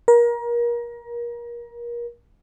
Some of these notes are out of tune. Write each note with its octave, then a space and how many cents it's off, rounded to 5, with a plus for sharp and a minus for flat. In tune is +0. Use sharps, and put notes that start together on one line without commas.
A#4 +30